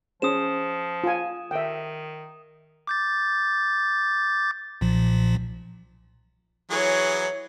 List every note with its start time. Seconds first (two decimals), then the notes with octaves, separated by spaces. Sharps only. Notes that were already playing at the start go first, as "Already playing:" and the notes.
0.22 F3 C#4 G#4 C5 D#6 E7
1.04 F4 G#5
1.51 D#3 E5 G5
2.87 D6 G6 A6
4.81 B1 A#2 F3
6.71 E3 F#3 G#4 C#5